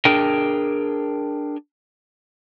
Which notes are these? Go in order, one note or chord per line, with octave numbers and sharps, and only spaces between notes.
D4 G#4 A#4 G5